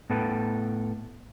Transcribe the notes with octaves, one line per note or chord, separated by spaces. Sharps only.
A2 B3 A4 B4 G5